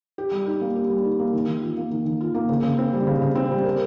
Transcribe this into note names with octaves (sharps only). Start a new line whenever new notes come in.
G4
G3
D#4
A#3
G4
G3
D#4
A#3
D#3
D#3
F4
A#3
D#3
D#3
F4
A#3
C#3
C#3
C4
G3
C#3
C#3
C4
G3
A#4